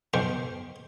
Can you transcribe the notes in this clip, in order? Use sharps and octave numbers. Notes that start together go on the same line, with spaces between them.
B1 G#2 C5 F5 G5 C#6